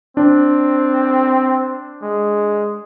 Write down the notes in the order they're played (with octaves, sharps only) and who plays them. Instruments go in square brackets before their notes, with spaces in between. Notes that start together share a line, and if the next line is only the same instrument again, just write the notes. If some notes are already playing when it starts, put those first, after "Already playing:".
[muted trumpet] C4 [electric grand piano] D4
[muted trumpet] G#3